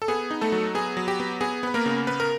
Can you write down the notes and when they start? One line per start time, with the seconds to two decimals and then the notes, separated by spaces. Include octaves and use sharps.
0.02 A4
0.08 B3 G#4
0.31 D#4
0.41 A3 A4
0.52 F#3
0.75 B3 G#4
0.97 F#3
1.08 G4
1.20 B3
1.41 B3 G#4
1.63 B3 B4
1.74 A#3 A#4
1.86 C#3
2.07 B3 B4
2.20 A#4